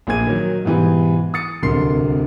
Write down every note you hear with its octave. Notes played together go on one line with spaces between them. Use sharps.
A#1 A#2 A#3 G#4 G#6 D#7
D#3 F#3
G#2 B2 E3 G3
D#6 A6 C#7
D1 C2 D3 A#4 C6 C7